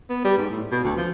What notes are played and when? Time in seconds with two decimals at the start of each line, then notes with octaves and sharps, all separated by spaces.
0.10 B3
0.24 G3
0.38 G#2
0.50 A2
0.71 B2
0.84 D2
0.97 F3